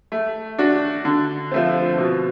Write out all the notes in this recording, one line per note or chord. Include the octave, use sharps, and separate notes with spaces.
A3
D4 F#4
D3
F3 A3 C4
B2